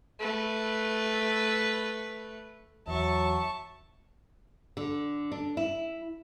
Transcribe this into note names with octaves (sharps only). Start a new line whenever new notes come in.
A3 B4
E2 F#3 E5 A5 C#6
D3
D4
E4